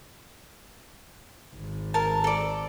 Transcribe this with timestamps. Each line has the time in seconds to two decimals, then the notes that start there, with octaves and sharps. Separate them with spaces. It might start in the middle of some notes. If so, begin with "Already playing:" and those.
1.55 G#1
1.94 A#4 A5
2.24 A4 D5